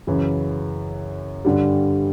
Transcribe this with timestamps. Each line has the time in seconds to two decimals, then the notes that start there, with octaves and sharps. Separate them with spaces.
0.07 F#2 C#3 E3
1.45 G2 D3 G3